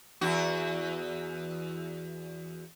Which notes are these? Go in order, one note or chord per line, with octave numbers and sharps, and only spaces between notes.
E2 F#4